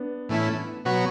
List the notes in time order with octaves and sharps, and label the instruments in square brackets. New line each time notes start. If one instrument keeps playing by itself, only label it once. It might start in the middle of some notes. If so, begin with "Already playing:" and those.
Already playing: [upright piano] B3 D4
[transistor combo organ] A2 E3 A3 C#4 E4
B2 F#3 B3 F#4 C#5